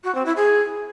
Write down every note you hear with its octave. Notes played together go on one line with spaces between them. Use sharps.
F#4
C4
E4
G#4